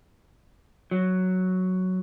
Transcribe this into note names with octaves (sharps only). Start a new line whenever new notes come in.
F#3